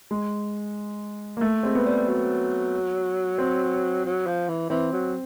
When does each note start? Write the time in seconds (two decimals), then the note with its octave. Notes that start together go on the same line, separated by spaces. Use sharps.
0.11 G#3
1.37 A#3
1.41 A3
1.63 G#3 C4
1.75 B3
1.85 G3
2.08 F#3
3.38 C4
4.05 F#3
4.27 F3
4.48 E3
4.70 E3 C4
4.92 F#3